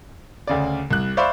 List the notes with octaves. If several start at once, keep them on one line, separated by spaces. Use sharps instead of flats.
D2 C#3 D5
C2 F#6
C5 D5 E5 F5 B5 C#6